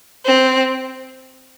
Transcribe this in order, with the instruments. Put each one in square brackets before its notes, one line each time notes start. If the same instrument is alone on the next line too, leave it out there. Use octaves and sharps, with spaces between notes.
[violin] C4